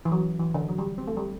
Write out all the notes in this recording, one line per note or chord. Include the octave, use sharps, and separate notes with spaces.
E3
F#3
E3
D3
F#3
G3
C4
A3
G3